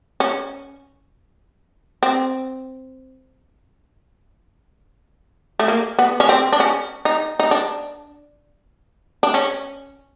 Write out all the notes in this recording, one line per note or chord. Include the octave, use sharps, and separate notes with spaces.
C#4
C4
A3
A#3
B3
C#4
C4
D4
C#4
D#4
D#4
D4
D4
C#4